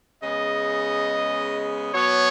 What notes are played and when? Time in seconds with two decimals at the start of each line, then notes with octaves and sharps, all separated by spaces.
0.23 C#3 G#3 B3 D#5
1.93 B2 F#3 B3 C#5